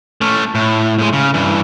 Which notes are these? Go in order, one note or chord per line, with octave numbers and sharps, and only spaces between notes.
A3 C#4
A2
A2 G#3
C#3
G2 E3